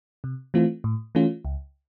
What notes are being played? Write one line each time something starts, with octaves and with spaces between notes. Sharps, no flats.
C3
E3 A3 C4 F4
A2
E3 A3 C#4 F4
C#2